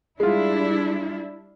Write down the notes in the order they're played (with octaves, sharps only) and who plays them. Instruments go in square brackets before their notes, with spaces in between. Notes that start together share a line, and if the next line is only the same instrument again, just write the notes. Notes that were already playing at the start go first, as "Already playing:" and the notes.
[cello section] G3 D4 E4 [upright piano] G#3 F4